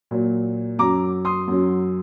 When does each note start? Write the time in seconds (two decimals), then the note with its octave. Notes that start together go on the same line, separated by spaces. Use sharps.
0.11 A#2 F#3
0.79 F#2 F#3 A#5 D6
1.25 C6 D#6
1.48 F#2 F#3